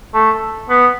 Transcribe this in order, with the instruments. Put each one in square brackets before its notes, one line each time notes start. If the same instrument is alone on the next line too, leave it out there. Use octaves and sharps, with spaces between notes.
[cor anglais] A3
B3